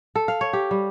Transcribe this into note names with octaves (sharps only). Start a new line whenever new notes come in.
A4
F5
C#5
G4
G3